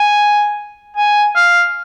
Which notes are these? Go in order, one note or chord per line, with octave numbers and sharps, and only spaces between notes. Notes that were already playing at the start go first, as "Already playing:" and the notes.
Already playing: G#5
G#5
F5